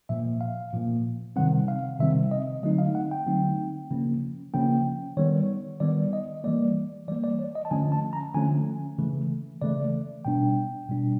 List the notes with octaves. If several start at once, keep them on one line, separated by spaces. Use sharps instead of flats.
A#2 F3 A#3 E5
F5
A#2 F3 A#3
C3 D#3 G3 C4 F#5
F5
C3 D#3 G3 C4 E5
D#5
D3 F#3 A3 C4 D#4 D#5
F5
F#5
G5
D3 F#3 A3 C4 D#4
C#3 F3 A#3 C#4
C#3 F3 A#3 C#4 G5
D#3 G3 B3 C#5
D#3 G3 B3 D5
D#5
E3 G3 A#3 D5
E3 G3 A#3 D5
D5
C#5
D#5
A5
D3 F3 A3 C#4 G#5
A5
A#5
D3 F3 A3 C#4 G#5
C#3 E3 A3
C#3 E3 A3 D5
B2 G3 B3 D4 G5
B2 G3 B3 D4